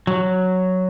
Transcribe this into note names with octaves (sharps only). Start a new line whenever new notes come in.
F#3